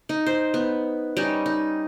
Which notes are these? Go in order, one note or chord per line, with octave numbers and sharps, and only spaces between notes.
D#4
C5
B3
G3 C#4 D#4
D#4